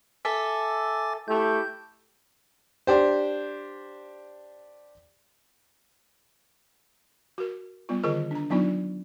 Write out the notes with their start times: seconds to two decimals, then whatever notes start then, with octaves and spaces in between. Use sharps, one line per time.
0.25 A4 E5 G#5 D6 A6
1.28 A3 E4 G4 G6
2.87 D4 G4 C5
7.38 F#4 A#4
7.89 G3 B3 F4
8.03 D3 D#3 F4 G#4 A#4 D#5
8.31 D4 A#5
8.50 F#3 B3 D4 D#4 F4 D5